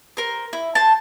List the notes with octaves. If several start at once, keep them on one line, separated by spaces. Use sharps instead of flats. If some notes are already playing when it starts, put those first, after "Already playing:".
A#4 C5
E4
C5 A5